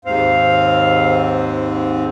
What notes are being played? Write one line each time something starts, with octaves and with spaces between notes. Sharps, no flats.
D#2 G#2 C4 F5